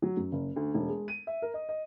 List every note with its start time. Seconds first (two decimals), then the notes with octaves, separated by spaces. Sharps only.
0.02 F#3
0.17 F#2
0.32 F#1
0.56 D2
0.74 E1
0.89 G#3
1.08 D#7
1.27 E5
1.42 A#4
1.54 D#5
1.69 D#5